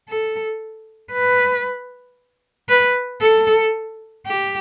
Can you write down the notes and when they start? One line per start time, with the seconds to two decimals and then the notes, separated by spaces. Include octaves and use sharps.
0.08 A4
1.12 B4
2.69 B4
3.21 A4
4.26 G4